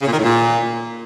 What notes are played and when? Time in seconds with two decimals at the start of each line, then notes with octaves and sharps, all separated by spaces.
0.02 C#3
0.07 A#2
0.12 D#3
0.18 A2
0.23 A#2